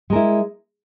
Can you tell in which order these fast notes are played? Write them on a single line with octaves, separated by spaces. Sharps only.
G#3 A#4 E4